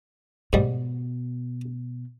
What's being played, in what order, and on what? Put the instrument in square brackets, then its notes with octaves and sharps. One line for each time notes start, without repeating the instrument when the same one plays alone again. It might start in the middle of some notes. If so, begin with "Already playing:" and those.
[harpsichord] G#2 G3 [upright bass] B2